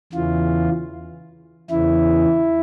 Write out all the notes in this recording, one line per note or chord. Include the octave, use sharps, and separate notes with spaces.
E2 C#3 E3 F4
E2 C#3 E3 E4